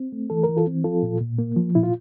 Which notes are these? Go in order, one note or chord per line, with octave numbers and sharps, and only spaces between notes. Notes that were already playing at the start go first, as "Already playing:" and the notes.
Already playing: C4
A3
E3 A4
E3 A#4
F4 A4
C4
F3 F4 A4
A#2
A#2
A#3
F3
A#2 E4
F4